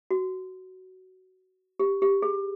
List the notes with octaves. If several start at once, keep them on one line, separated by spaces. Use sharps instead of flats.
F#4
G4
G4
G#4